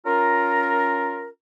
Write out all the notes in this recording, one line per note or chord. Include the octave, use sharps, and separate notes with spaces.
C#4 F4 A#4